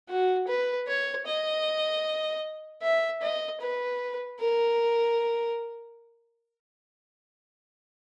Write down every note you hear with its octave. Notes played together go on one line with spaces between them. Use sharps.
F#4
B4
C#5
D#5
E5
D#5
B4
A#4